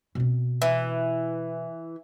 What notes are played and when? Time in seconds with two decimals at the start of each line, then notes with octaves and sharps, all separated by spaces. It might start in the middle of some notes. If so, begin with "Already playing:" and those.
0.15 B2 C4
0.62 E3